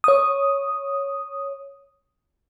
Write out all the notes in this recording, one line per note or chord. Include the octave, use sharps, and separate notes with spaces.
C#5 D#6